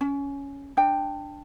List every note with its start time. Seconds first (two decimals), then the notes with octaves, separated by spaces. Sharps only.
0.01 C#4
0.77 D4 G5